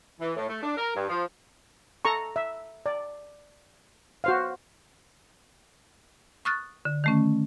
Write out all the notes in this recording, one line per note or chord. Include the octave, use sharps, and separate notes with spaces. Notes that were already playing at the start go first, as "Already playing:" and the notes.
E3
A2
A3
D4
A#4
G2
F3
A4 A#5 C#6
E5
D5
F#4 C5 F5
C#6 D#6 F6 F#6 A6
D3
D#3 A3 C#4